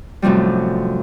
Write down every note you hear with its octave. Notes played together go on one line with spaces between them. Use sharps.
F#2 A2 C3 F3 G3